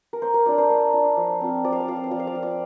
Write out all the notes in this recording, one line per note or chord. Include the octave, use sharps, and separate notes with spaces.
A#4
A#3 C5
A#4
D4 F4 D5
C5
A#3
D4 F4
F3
C4 F4
F3 D5
F5
D5
C4 F4 F5
D5
F5
F3 D5
F5
D5
C4 F4 F5
D5